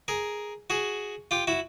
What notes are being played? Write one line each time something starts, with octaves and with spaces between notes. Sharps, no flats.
G#4 A#4
F#4 G#4
F4 G4
E4 F#4